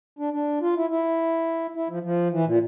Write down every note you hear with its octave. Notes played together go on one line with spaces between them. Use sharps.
D4
D4
F4
E4
E4
E4
F3
F3
E3
A#2